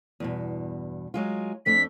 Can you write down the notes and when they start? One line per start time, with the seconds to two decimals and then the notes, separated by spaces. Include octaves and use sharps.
0.20 E2 G2 B2
1.14 F#3 G#3 F4
1.66 F2 A3 D4 B6